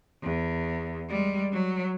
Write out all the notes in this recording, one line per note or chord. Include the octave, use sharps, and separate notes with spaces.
E2
G3 G#3
F#3